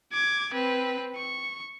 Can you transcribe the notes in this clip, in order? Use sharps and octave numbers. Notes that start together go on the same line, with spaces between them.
D6 G#6
C4 B4
C#6